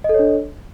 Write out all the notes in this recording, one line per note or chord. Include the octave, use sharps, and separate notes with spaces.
D4 A4 C#5 D#5